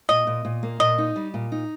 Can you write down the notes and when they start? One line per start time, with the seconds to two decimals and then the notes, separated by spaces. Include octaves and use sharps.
0.09 A#2 D#5
0.27 A#2
0.45 A#2
0.63 A#3
0.80 A#2 D#5
0.98 D#4
1.16 G3
1.34 A#2
1.52 D#4